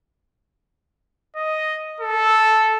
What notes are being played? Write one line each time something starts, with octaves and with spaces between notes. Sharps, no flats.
D#5
A4